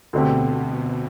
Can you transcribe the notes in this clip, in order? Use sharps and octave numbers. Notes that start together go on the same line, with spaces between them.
D2 B2 D3 A3 C4 G4
B2